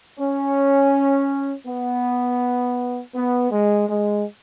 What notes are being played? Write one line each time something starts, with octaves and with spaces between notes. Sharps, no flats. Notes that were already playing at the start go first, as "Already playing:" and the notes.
C#4
B3
B3
G#3
G#3